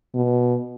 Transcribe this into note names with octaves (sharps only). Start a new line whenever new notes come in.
B2